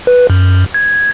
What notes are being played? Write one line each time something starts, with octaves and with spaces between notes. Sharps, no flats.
B4
F#2
G#6